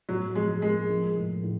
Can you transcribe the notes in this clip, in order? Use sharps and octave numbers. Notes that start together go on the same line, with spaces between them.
A2 F#3
F3 G#3
G#3 A#3
F3
A2
A2